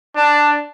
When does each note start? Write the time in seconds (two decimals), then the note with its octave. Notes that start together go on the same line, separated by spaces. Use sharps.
0.16 D4